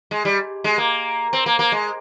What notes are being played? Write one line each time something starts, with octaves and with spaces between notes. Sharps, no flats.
G#3
G3
G#3
A#3
C4
A#3
A#3
G#3